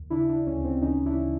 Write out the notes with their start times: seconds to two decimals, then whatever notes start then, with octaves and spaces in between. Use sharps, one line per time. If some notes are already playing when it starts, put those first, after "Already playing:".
Already playing: D#2
0.10 C#3 D4 E4
0.29 D4 E4
0.46 D2 C#4
0.64 C4 D4
0.81 E3 C#4 D#4
1.06 D4 E4